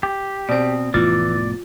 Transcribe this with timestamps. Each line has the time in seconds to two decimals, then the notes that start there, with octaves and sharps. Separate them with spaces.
0.03 G4
0.49 B2 C4 D5
0.94 F1 A2 E3 B3 F4 D5